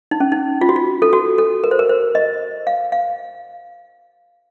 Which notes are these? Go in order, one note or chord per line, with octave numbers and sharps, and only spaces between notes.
D#4
C#4
D#4
F4
F#4
F4
A4
F#4
A4
A#4
C5
A#4
C5
D#5
F5
F5